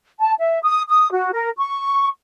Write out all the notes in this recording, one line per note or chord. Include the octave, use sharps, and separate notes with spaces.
A5
E5
D#6
D#6
F#4
A#4
C#6